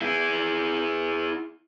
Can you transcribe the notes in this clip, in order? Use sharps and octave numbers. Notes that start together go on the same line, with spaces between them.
E4 G#4